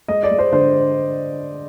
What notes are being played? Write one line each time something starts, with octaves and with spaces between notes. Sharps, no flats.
G#3 D#5
D5
G#3
C5
D3 C5